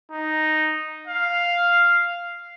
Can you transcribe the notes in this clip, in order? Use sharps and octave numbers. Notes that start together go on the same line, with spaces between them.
D#4
F5